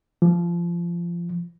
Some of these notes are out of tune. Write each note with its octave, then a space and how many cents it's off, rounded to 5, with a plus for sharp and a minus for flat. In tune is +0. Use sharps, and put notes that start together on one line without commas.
F3 -20